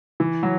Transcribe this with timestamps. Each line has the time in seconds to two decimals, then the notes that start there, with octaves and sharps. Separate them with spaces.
0.20 E3
0.43 F#3